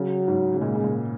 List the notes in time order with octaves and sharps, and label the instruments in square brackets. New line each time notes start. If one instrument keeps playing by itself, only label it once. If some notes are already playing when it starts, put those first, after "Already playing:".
Already playing: [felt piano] C#3 [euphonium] F#3
[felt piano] G#2
C#3
[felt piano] A#2 [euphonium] G#3
[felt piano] C#3
A#2